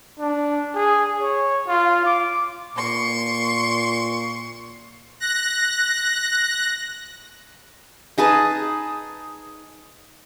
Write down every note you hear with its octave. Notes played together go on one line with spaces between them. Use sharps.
D4
G#4
C#5
F4
D6
A#2 C6 C#6
F#6 A#6
D#4 G#4 B4 A5